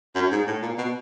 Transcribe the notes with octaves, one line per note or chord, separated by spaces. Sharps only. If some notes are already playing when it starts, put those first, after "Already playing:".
F#2
G#2
A2
A#2
B2